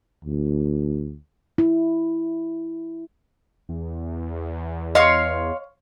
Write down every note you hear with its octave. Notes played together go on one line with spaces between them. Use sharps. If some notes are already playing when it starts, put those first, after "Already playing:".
D2
E4
E2
C#5 D#5 F5 C6